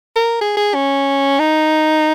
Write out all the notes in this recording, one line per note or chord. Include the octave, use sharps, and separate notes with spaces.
A#4
G#4
G#4
C#4
D#4